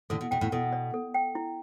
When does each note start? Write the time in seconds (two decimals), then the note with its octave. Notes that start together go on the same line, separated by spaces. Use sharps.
0.10 A2 D3 A4
0.21 B2
0.31 B2 G5
0.41 A2
0.52 B2 A4
0.73 D5
0.94 A4
1.14 G5
1.35 E4